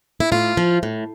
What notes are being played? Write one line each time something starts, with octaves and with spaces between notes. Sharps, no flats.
E4
A2 F4
F3
A2